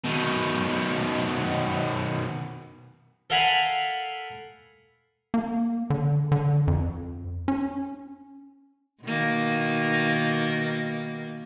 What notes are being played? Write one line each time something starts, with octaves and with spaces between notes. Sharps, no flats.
B2 D#3
A4 A#4 F5 F#5 G#5 B5
A#3
D3
D3
F2
C#4
B2 D#3 A#3